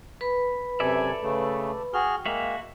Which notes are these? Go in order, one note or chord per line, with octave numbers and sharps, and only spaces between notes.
B4 B5
F#2 C3 A4 D5 E5 G#5
C#3 A3
F#4 G#4 G5 F6
G#3 A#3 F#4 E5 F5